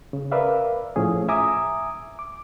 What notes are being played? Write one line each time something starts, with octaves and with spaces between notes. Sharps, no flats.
C#3
A#4 B4 D5 E5 F5
A2 F3 C#4 G#4
E5 G#5 A#5 D6 D#6
D6